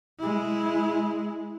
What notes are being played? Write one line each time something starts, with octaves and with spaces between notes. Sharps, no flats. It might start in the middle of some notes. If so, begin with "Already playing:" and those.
G#3 E4